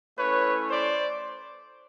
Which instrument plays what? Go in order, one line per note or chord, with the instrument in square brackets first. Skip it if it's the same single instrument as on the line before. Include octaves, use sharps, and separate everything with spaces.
[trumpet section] A3 C#4 E4 B4 C#5
C5 D5